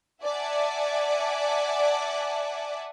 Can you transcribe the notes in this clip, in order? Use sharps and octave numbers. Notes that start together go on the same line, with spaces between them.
D5 E5 F#5 G#5 A5